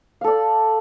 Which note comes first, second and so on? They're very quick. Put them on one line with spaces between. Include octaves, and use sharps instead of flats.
F5 A4 D5